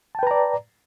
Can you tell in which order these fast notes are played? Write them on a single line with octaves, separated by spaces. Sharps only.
A5 G5 B4 A#5 D5